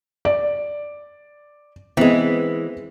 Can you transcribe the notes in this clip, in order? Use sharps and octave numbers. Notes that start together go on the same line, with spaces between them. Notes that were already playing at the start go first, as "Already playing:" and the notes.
D5
E3 G#3 B3 C4